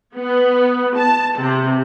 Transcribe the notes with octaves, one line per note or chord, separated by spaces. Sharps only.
B3
A5
C3